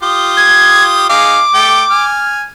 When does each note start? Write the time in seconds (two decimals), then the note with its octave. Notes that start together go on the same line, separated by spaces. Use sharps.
0.03 F4 G4 D#6
0.37 G#6
1.09 D#4 G#4 F5 D6
1.54 A3 G5
1.90 G#5 F6